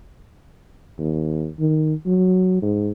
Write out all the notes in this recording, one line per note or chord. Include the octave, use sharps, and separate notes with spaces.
D#2
D#3
F#3
G#2